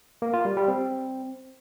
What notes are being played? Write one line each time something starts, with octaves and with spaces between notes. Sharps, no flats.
A#3
F4
G3
G3
C4